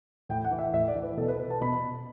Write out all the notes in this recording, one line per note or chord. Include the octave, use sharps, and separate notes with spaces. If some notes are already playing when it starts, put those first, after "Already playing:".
A2 G5
F#5
E3
E5
A2 E5
D5
E3
B4
B2 A4
B4
B4
A5
B2 B5